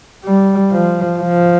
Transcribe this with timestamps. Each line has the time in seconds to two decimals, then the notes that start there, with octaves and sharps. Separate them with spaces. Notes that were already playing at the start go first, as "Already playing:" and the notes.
0.24 G3
0.71 F3
1.19 F3